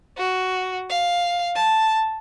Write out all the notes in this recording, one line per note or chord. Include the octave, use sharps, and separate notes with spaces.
F#4
F5
A5